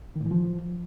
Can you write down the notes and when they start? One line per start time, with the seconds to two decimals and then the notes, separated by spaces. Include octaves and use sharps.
0.16 D#3
0.21 A2
0.26 E3
0.31 F3